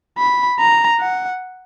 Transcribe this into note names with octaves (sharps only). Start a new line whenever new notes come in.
B5
A#5
F#5